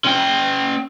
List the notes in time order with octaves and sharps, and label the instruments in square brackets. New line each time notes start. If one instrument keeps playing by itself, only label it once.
[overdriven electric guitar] C#4 G5